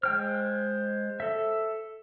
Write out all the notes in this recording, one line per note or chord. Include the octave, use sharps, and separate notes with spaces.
G#3 C5 G5 F6
A4 E5